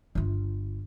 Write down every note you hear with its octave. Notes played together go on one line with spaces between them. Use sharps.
G1 F4